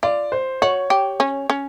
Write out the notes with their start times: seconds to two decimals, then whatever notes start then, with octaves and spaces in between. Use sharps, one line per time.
0.03 F4 D5
0.32 C5
0.62 F#4 C#5
0.90 G4
1.20 C#4
1.50 C#4